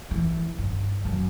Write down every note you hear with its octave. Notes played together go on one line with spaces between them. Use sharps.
E3
G2
F#2